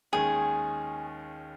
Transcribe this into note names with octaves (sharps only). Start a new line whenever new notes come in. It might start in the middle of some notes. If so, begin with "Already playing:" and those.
D#2 D#3 G#3 C#4 G#4